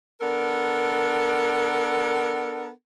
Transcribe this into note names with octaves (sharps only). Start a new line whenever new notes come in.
B3 D4 A4 A#4